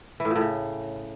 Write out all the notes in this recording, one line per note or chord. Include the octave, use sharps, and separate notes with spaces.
E3
A2
A#2
A2
C#3